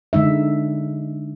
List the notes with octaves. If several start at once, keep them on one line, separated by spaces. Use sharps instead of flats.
D3 G#3 D#4 E5